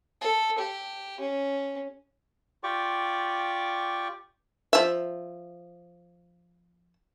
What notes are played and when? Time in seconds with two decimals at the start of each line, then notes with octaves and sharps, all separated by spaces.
0.21 A4
0.58 G4
1.20 C#4
2.63 F4 G4 D5 G5 C#6 D6
4.73 F3 E5